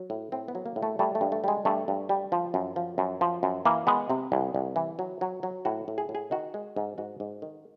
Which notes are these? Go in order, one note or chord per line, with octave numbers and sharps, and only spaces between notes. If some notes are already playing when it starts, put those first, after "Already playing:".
Already playing: F#3
A2
A2 C4
B3
F#3
A#3
A2
A3
G3 A3
A3
G2
A3
G3 G#3
G2 A3
G2
G3
F3
F#2
F3
F#2
F3
F#2
E3 A#3
G#3 B3
C3 C4
C2
C2
E3
F#3
F#3
F#3
A2 F#4
A2
G#4
A2
G#4
D#3 F#4
G#3
G#2
G#2 F#4
G#2
D#3